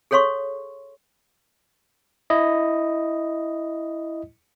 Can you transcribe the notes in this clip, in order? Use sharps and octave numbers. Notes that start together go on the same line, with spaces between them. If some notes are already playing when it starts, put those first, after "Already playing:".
G#4 A4 C#5 F5 C6 C#6
E4 D#5